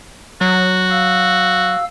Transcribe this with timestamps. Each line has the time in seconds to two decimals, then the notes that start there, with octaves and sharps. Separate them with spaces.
0.41 F#3 F#4
0.90 F5 E6